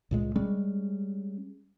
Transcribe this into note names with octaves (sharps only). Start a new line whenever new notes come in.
C#2 A#2 G#3
G3 G#3 C#4